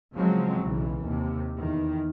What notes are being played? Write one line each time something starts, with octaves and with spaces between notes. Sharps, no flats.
C#3 F3 F#3 G#3 C4 C#4
B1 C#3 E3
D#2 C3
E2 D#3